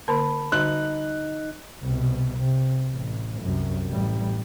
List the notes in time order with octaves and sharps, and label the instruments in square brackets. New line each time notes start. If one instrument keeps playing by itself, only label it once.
[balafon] D3 A#3 A#4 [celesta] A5 B5
[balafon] D3 G3 F#4 [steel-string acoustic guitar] D#4 [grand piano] F#6
[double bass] C2 B2
C3
A1
C2 F#2
A1 G3